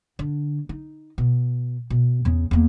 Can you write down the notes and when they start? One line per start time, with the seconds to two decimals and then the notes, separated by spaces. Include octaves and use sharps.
0.19 D3
0.69 D#4
1.18 B2
1.90 B2
2.25 E2 C#3
2.51 E2 A#3